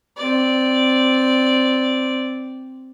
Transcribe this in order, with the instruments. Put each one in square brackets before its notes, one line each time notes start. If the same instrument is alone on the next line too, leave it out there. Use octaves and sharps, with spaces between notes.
[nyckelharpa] C4 D5